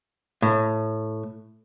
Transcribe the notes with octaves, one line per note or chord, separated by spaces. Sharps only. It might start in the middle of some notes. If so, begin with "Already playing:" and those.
A2